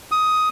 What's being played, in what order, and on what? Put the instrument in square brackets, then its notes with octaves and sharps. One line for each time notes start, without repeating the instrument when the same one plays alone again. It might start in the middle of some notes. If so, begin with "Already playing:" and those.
[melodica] D#6